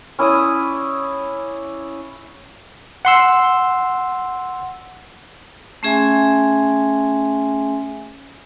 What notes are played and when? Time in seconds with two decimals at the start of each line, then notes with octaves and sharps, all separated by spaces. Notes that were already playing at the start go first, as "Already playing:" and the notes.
0.19 C#4 E4 D5 D#6
3.05 F#5 C6 E6
5.83 A3 C#4 G#4 E5 G#5 C6